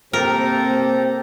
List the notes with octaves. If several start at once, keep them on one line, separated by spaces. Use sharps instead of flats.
C3 A#3 C4 G4 A4 A#4 A#5